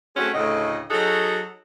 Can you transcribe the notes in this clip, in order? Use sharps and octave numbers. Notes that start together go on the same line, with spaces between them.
A3 C4 C#4 F#4 G#4
D2 A2 C#3 D#5
F#3 D#4 F#4 G#4 A4